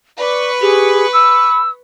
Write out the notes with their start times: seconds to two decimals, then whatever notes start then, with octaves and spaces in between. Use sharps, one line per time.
0.19 B4 D5 C#6
0.61 G4 G#4
1.13 B5 E6